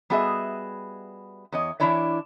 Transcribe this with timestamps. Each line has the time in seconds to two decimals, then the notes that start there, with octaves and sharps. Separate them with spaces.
0.10 G3 B3 F#4 G#4 D#5 E5
1.52 E2 C#5 D#5
1.80 E3 G#3 D4 E4 C#5 D5